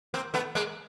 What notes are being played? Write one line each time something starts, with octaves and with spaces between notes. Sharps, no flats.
A#3 C4
A3 B3
G#3 A#3